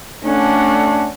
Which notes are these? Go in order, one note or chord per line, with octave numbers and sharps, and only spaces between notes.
A3 C#4 D4 F#5